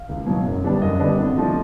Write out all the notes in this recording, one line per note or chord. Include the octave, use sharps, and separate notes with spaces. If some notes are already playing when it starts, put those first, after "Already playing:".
Already playing: F5
C#2
B2 F#3
F#2
D3 G3 B3 D4
F#2 D#5
D3 G3 B3 D4
C3
F3 A3 D4